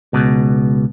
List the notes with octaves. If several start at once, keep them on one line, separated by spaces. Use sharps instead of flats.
C#2 B2